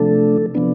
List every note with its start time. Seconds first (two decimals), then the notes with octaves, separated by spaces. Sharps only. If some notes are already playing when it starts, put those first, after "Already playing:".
Already playing: C3 F3 A3 D4 A4
0.55 C3 F3 B3 D4